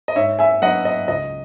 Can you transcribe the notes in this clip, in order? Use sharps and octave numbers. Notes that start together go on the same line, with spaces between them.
D#5
G#2 C#5 E5
E5 G#5
F#3 B3 D#5 F#5
D#5
C#2 D#5